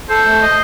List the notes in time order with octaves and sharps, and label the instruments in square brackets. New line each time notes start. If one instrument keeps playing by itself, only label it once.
[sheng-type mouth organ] A4 [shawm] C5
[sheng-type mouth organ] A3
D#5